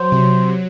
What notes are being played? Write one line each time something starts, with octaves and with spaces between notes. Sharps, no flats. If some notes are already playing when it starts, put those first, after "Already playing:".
Already playing: F#3 C5
C3